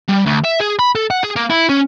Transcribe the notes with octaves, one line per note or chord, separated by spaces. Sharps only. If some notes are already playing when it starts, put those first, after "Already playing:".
G3
D2
E5
G#4
B5
A4
F#5
G#4
A#3
E4
C#4